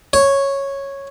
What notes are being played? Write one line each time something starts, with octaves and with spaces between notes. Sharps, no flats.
C#5